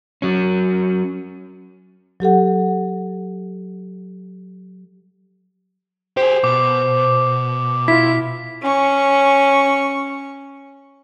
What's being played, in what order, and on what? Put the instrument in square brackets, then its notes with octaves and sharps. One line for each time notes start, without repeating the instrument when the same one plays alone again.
[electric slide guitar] F#3 C#4
[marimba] F#3 G4 A4 F#5
[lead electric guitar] G4 G#4 [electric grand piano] C5
[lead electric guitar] B2 [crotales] D6
[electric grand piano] E4 F4 [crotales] B6
[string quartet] C#4 C#6